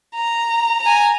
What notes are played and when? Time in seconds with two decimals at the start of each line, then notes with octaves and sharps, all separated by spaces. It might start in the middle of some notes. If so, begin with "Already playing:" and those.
0.15 A#5
0.82 G#5 A#5